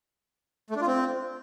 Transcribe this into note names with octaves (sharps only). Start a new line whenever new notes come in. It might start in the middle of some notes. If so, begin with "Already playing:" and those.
A3
D4
F4
C4